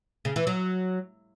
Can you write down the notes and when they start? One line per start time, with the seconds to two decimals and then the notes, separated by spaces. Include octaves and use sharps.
0.25 C#3
0.36 E3
0.47 F#3